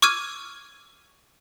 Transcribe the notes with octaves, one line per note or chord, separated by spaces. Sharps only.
C#6 D6 E6 F6 G#6 D#7